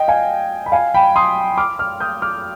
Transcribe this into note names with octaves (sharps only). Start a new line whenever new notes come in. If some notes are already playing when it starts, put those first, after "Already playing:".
Already playing: D#5 G5
F5 G#5
B5
F5 G#5
G5 B5
C6 D#6
D6 F6
D6 F6
D#6 G6
D6 F6